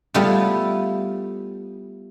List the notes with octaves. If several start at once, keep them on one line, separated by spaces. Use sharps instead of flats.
G3 A3 B3 E4 F4